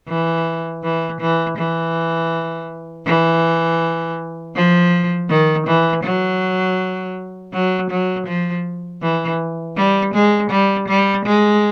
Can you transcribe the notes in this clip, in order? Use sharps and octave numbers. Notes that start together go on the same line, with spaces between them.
E3
E3
E3
E3
E3
F3
D#3
E3
F#3
F#3
F#3
F3
E3
G3
G#3
G3
G3
G#3